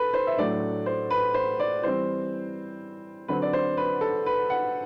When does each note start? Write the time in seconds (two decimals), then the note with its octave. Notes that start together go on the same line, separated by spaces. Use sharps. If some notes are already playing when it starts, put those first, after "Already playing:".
Already playing: A4 B4
0.14 C5
0.27 E5
0.38 A2 F#3 A3 D4 D5
0.86 C5
1.11 B4
1.34 C5
1.60 D5
1.83 E3 G3 C4 C5
3.28 D3 F#3 C4 B4
3.42 D5
3.53 C5
3.77 B4
4.01 A4
4.26 B4
4.50 F#5